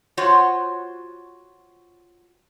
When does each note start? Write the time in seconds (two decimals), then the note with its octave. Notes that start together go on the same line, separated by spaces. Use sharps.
0.17 F4 F#4 C5 C#5 F#5